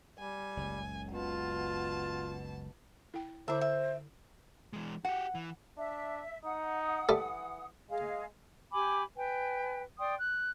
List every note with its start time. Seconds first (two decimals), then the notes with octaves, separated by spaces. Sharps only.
0.19 G3 G#5
0.57 F#1 C#2
1.13 B2 F4 A5
3.14 E4 G5
3.48 D3 E4 C5 C#5 E5 D6
3.61 E5
4.73 E3 G#3
5.05 F#4 G4 F#5
5.35 E3
5.78 D4 E5
6.44 D#4 F#5 D#6
7.09 E3 G3 A3
7.90 G#3 G#4 D#5 F5
8.73 G4 G#5 B5 D6
9.16 B4 G5 G#5
10.00 D5 G5 C6 D#6
10.17 F#6